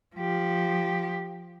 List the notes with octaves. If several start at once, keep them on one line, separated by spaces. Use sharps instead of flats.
F3 G4